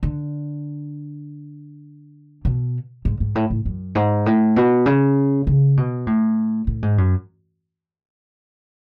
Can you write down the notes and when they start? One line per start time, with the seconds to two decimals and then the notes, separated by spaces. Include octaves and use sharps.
0.03 D3
2.45 B2
3.05 G#2
3.20 G#2
3.35 A2
3.50 A2
3.65 F#2
3.95 G#2
4.26 A2
4.56 B2
4.86 C#3
5.47 C#3
5.77 B2
6.07 A2
6.67 A2
6.82 G#2
6.98 F#2